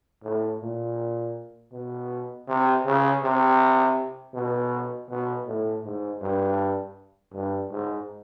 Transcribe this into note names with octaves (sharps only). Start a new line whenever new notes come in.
A2
A#2
B2
C3
C#3
C3
B2
B2
A2
G#2
G2
G2
G#2